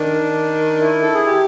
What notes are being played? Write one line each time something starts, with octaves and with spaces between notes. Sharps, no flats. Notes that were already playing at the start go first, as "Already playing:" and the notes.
Already playing: D#3 D4
E4
A4
G#4
G4